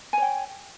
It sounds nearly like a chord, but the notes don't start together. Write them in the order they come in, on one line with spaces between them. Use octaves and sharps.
G#5 C#5 G5